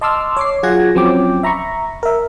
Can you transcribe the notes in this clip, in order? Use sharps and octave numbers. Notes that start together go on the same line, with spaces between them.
D#5 A5 C6 D6 E6 F6
C#5 D6 C7
F#3 F4 G#4 F#5 G#6 A#6
F3 F#3 C4 C#4 G5 D6
E5 A#5 B5 C#6
A#4 E5